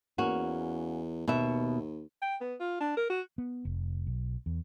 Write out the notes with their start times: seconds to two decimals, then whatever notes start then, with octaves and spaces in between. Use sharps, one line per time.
0.18 E2 A#3 C#4 F#4
1.28 D#2 B2 F#4 E5
2.22 G5
2.41 B3
2.60 F4
2.81 D4
2.97 A#4
3.10 F#4
3.38 B3
3.65 F1
4.07 B1
4.46 E2